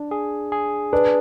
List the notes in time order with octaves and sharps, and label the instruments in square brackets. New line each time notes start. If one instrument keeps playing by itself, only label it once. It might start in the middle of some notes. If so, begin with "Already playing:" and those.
Already playing: [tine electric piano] D4
G#4
G#4
[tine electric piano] D4 [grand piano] B4